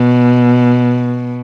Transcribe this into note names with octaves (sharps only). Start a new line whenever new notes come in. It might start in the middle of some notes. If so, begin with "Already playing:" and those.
Already playing: B2